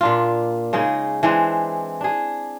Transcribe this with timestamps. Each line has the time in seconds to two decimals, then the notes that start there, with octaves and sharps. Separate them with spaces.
0.01 A#2 D4 F4
0.73 C#3 G#3 D#4 G#4
1.23 E3 G#3 C4 D4
2.01 D4 G#4